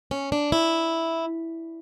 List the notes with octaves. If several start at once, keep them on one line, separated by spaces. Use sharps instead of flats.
C#4
D4
E4